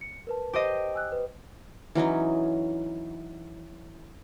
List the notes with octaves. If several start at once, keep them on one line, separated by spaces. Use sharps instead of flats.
C#7
A#4 B4 A5
G4 C5 D#5
G#5 E6 F#6
B4
E3 F#3 C#4 D#4